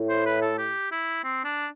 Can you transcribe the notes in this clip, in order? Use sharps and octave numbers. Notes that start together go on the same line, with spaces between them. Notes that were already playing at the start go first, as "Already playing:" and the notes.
Already playing: A2
C5
B4
A4
G4
E4
C4
D4